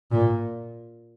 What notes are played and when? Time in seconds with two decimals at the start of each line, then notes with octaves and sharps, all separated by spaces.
0.12 A#2